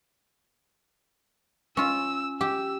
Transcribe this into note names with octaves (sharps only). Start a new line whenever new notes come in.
C#4 F4 E6
G4 E6